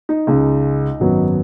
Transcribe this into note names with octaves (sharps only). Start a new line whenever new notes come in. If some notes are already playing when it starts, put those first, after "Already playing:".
D#4
C#2 C#3 G#3
G#1 F#2 F#3 B3